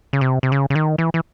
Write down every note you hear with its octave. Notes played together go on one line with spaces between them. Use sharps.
C#3
C3
C3
C#3
C#3
D#3
E3
E3